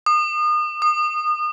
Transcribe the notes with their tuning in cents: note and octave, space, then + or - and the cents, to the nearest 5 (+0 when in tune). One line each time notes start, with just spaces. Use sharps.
D#6 -35
D#6 -25